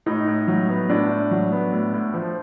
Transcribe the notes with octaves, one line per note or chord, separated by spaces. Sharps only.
A2 D#4
A2
F#3
B3
A2 D4
A2
F#3
B3
A2
A2
F3